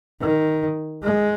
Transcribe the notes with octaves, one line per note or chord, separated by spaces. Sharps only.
D#3
G#3